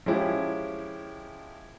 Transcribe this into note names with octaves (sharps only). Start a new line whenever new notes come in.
F3 G#3 C#4 E4 G4